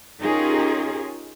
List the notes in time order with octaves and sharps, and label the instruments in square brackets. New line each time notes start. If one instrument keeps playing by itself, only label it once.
[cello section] C#4 D#4 F4 G4 G#4 A#4